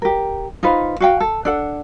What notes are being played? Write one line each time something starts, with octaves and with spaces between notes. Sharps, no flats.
G4 A#4
D#4 F4 B4 C5
F#4 F5 G5
A4
D4 A4 F#5